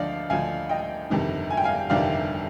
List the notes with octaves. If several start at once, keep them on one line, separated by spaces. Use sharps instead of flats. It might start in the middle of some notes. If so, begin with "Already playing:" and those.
Already playing: D2 D3 F3 D5 D#5 F5
D2 D3 F3 F5 G#5
D#5 G5
G1 F2 C3 D#3
G#5
G5
F5 G#5
G1 F2 C3 D#3 D5 F5